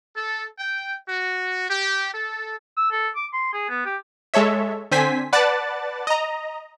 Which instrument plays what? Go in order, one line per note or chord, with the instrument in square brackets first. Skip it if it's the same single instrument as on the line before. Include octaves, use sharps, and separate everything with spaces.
[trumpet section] A4
G5
F#4
G4
A4
[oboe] E6
A4
D6
C6
G#4
B3
G4
[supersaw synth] G#3 A4 C#5 E5
D3 C4 C5 G#5 B6
B4 D5 F#5 A5 F#6 A6
D#5 A#5